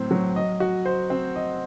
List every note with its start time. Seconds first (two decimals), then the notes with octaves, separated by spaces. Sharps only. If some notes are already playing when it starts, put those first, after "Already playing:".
Already playing: A2 F#3 C4
0.11 F#3
0.36 D#5
0.60 F#4
0.86 C5
1.10 C4
1.36 D#5